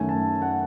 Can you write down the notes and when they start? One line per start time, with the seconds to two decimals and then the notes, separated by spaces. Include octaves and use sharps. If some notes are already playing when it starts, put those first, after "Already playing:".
Already playing: F#2 D#3 A3 G#5
0.09 A5
0.42 F#5